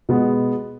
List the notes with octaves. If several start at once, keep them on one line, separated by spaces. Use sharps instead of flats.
B2 G#3 B3